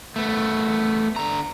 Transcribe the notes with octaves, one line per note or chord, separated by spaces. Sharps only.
A3 B3
D3 A#5